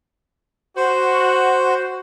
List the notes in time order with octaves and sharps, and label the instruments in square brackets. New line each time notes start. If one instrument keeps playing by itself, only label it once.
[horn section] F#4 [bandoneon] C5